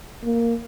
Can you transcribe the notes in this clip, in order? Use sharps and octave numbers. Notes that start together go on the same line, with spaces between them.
A#3